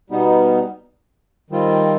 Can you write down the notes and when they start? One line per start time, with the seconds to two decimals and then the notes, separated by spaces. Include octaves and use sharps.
0.10 B2 G3 B3 D#4
1.50 D#3 G3 C4 F4